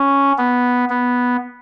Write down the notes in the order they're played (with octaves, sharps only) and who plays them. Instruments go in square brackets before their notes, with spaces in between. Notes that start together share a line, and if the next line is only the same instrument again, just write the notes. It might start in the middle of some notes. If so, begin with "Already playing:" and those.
Already playing: [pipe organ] C#4
B3
B3